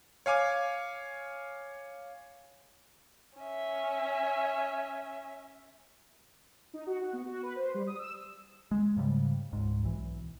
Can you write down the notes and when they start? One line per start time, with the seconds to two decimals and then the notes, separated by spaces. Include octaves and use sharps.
0.26 C#5 F5 G#5 D6
3.38 C#4 E5
6.74 D#4
6.87 F#4
7.01 F#4
7.13 B3
7.26 F#4
7.43 B4
7.56 C5
7.74 G3
7.87 D#6
7.99 E6
8.71 G#3
8.96 G#2 C#3 F3 G3
9.53 C#2 G#2
9.83 B1 E3